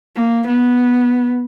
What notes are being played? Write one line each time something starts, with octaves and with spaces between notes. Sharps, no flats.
A#3
B3